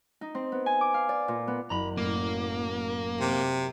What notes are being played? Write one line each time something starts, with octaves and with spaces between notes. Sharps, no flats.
D#4
C4
B3
G#5
D6
F5
D5
A#2
B3
F#1 A#5 B5
F#2 A2 F#3 A#3
C3